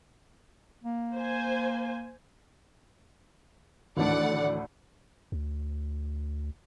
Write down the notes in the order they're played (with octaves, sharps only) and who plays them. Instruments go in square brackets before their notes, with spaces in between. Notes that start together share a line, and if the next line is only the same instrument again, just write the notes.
[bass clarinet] A#3
[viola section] C5 G#5
[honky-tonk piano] D2 A2 [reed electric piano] D#3 E3 D4 [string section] D5 F#5
[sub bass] D2